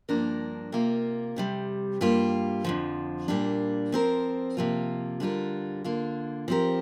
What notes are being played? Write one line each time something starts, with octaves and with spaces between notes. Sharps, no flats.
G2 F3 A#3 D4 A#4
C3 A#3 F4 A#4
F2 C3 G3
G2 G3 A#3 F4
F2 D3 F3
A#2 G3 A#3 D4
F3 C4 A#4
C3 F3 A#3 F4
D3 G3 D4 F4 A#4
D3 A#3 F4
F3 C4 G4 A#4